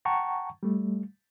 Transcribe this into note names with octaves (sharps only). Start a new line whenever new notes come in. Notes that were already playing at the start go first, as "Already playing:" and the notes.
F#5 G5 A5 A#5 C#6
G3 A3